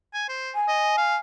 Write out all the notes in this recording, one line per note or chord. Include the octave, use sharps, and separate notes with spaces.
G#5
C5
G#5
D#5
F5